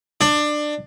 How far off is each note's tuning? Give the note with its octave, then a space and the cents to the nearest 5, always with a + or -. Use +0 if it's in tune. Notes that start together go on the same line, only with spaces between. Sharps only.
D4 +20